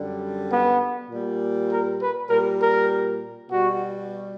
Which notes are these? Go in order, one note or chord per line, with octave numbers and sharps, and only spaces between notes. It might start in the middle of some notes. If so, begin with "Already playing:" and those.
Already playing: F#2 D3 G3
B3
A#2
G3
A#4
B4
A#2 G3 A#4
A#4
B2 G3 F#4